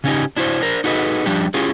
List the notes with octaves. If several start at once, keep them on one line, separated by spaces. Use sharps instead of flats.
C#3 C#4 D#4 G4
D4 E4 F#4 A4 C5
D4 A#4 C5
D#4 F#4 G#4 A4 B4 D#5
F3 G3 D4 G4
C#4 E4 F4 G4 G#4